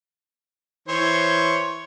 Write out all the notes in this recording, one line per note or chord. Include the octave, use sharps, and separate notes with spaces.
E3 C5 C#5